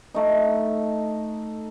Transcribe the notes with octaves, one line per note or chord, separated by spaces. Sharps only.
A3 D#4